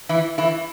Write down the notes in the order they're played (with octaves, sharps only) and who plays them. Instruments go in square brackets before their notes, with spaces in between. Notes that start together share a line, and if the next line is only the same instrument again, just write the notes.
[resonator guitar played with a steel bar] E3 E4
E3 E4